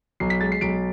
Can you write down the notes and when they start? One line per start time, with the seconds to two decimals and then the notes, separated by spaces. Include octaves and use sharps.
0.20 B1 C7
0.30 B6
0.41 G#3 A6
0.52 C7
0.61 B1 D7